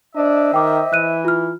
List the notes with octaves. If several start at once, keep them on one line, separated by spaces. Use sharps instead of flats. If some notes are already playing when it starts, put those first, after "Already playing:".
D4 C5 D#5 E5
D#3 G5 D6
E3 F#6 D#7
F4 F6